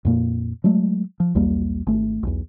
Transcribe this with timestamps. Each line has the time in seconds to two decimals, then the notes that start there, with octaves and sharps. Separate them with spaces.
0.05 F2 A#2 A#3
0.64 F#3 G#3 A3
1.20 F3
1.35 B1 E2 G3 A#3
1.87 G#1 A3
2.23 B1 E2